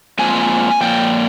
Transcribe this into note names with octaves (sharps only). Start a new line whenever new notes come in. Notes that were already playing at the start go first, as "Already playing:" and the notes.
A#2 F3 G#3 C4 G#5
A#2 F3 G5